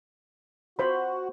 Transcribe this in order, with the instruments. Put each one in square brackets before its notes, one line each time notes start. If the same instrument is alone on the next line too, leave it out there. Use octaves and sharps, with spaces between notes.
[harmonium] F#4 [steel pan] C5 B5